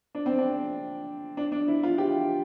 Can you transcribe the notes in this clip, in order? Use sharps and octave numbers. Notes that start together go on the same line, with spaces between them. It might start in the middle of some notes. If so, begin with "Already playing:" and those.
D4
C4
D4
D4
D4
E4
F4
G4